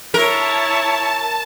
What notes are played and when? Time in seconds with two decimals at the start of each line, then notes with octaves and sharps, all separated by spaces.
0.14 E4 A#4 C#5 A5